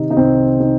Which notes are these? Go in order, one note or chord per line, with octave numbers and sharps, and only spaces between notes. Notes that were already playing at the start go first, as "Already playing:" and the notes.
Already playing: C3 D#3 D#4
D#4
C2 C4
D#4